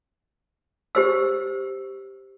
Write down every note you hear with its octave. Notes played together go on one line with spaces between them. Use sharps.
G4 C5 E6